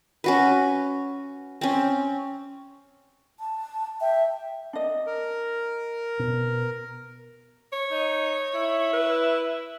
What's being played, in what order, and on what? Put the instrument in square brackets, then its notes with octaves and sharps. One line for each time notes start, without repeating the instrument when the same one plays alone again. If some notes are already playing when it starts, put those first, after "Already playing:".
[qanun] C#4 F#4 B4
C4 C#4
[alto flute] A5
[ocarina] E5 [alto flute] G5
[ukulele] D4 D#5
[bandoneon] A#4
[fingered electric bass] B2
[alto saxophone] C#5
[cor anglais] D#4
E4
[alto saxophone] B4